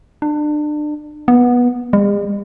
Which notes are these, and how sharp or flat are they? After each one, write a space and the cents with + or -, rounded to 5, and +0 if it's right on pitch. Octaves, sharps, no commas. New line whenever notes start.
D4 +30
B3 -15
G#3 -45